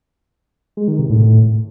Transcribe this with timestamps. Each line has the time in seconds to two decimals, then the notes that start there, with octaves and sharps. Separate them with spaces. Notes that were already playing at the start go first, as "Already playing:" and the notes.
0.77 G#3
0.88 D#3
0.99 C3
1.10 A2